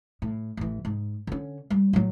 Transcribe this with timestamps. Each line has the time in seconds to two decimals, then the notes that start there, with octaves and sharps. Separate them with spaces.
0.22 A2
0.57 A1 E3
0.85 G#2
1.27 D3 C#4
1.70 G3
1.93 A2 F#3